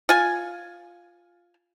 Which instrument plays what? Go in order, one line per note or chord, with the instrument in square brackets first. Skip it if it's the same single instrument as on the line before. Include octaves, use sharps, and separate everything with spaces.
[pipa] F4 G#5